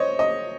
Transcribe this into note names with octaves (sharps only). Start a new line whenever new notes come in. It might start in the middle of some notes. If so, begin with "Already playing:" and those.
Already playing: C5 C#5 D#5
D#5